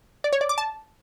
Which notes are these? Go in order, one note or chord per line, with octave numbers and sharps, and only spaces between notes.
D5
C#5
D5
D6
A5